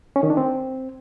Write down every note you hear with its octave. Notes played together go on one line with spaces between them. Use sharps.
C#4
D#3
D4
C4